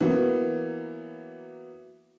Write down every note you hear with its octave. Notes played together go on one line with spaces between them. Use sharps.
E3 F#3 A#3 B3